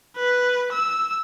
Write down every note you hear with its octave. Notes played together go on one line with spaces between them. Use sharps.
B4
E6